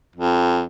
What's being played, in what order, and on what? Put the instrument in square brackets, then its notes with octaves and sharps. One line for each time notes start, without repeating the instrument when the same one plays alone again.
[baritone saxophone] F2